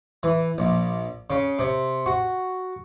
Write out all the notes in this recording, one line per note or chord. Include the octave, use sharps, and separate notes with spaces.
E3
A#1
C#3
C3
F#4